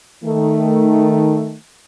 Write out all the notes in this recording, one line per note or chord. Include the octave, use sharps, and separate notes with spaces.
D#3 A3